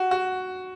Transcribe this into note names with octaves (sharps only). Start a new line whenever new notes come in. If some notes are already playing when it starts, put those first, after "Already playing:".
Already playing: F#4
F#4